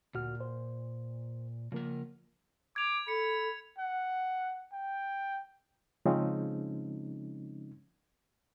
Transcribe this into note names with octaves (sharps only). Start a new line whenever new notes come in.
D2 A#2 F#4 F6
C5
C#3 F3 A#3 A#4
D6 G#6 F7
A4 B5 C#7
F#5
G5
C#3 F3 G#3 C4 C#4 D#4